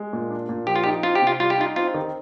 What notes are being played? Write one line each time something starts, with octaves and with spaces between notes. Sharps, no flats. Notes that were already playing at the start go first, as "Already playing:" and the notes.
Already playing: G#3
A#2
D4
A#2
F3 G4
F4
D#4 G4
C4 F4
G4
C3
F4
G3 F4
G4
D#4 F4
C4 F4
D#3